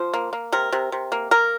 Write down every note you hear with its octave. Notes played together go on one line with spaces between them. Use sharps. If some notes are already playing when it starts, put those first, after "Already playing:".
Already playing: F3 C5
A#3
A#3
C3 A#4
C3
C3
A#3
A#3 A#4